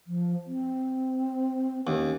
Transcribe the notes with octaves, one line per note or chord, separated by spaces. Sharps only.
F3
C4
D#2 C#4